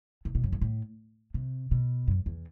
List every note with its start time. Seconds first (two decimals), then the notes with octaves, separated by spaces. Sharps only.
0.25 C3
0.35 B2
0.44 F#2
0.52 G2
0.61 A2
1.34 C3
1.71 B2
2.08 F#2
2.26 E2